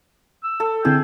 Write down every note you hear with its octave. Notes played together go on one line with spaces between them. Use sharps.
E6
A4
D3 C4 E4 G#4 G5